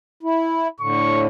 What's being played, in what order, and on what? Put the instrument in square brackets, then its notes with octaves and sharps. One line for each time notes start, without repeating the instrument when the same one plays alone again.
[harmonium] E4
[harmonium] A2 D3 [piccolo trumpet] C#6